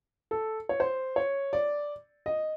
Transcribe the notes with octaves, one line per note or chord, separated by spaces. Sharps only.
A4
C#5
C5
C#5
D5
D#5